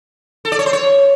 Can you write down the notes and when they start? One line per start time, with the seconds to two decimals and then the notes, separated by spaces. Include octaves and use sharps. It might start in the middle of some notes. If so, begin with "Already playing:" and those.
0.45 A4
0.52 D5
0.59 C#5
0.66 C5
0.73 C#5